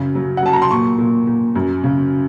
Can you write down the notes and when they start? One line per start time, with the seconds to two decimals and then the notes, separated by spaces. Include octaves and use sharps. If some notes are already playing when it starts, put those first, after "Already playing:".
Already playing: F#2 C#3
0.15 F#3
0.37 F#5
0.43 F#3 A5
0.53 A#5
0.62 C6
0.71 A#2 C#6
0.98 A#2
1.27 A#2
1.55 F#2
1.84 C#3